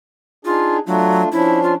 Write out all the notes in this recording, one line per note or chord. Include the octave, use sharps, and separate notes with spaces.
D4 D#4 F4 G#4
F#3 A3 D4 F4
F3 C#4 D4 E4
F4